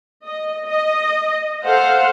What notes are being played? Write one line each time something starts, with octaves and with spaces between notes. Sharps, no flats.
D#5
D#5
A4 C5 F5 F#5